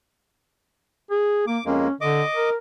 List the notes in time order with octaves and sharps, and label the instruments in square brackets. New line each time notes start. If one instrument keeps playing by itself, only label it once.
[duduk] G#4
[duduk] A#3 [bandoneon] D6
[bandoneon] F2 G#3 A#3 [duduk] C#4
[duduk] D3 [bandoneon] D#5 D6
[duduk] A#4